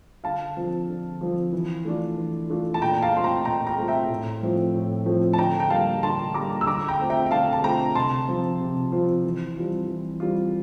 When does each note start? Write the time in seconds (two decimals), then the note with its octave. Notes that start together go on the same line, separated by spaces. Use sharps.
0.24 D3 F5 A5
0.57 F3 C4 F4
0.88 D3
1.21 F3 C4 F4
1.53 E3
1.85 A3 D4 F4
2.18 E3
2.50 A3 D4 F4
2.74 A5
2.82 A#2 G5 A#5
3.02 F5 A5
3.14 A3 C4 F4 C6
3.24 G5 A#5
3.45 A#2 G5 A#5
3.67 G5 A#5
3.78 A3 C4 F4
3.88 E5 G5
4.10 A2
4.42 F3 A3 C4 F4
4.75 A2
5.06 F3 A3 C4 F4
5.33 A5
5.38 D3 G5 A#5
5.60 G5
5.70 G3 A#3 F5 A5
6.03 D3 A5 C6
6.34 G3 A#3 A#5 D6
6.61 E6
6.67 D3 A#5 D6
6.88 G5 A#5
7.00 A3 C4 F4
7.10 E5 G5
7.27 G5
7.31 D3 F5 A5
7.53 A5
7.63 A3 C4 F4 G5 A#5
7.95 C3 A5 C6
8.28 F3 C4 F4
8.60 C3
8.92 F3 C4 F4
9.25 E3
9.56 G3 C4 F4
9.88 E3
10.20 G3 C4 F4